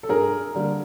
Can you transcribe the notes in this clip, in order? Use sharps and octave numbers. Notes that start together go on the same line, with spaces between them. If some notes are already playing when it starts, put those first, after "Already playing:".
A4
G2 G#4 A#4
D3 G3 A#3